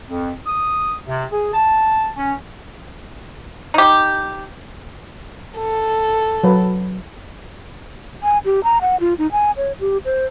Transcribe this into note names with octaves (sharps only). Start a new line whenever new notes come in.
F2
D#6
C3
G#4
A5
C#4
D#4 G4
A4
F#3 B4
G#5
G4
A#5
F#5
F4
D#4
G#5
C#5
G4
C5